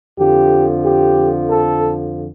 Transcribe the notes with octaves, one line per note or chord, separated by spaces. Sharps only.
F2 D3 F3 G4
G4
A4